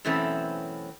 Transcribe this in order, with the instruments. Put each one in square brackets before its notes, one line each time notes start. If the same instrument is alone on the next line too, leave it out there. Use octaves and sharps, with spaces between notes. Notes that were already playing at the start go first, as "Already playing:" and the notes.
[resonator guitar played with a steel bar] F#2 B2 E3 A3 C4 C#4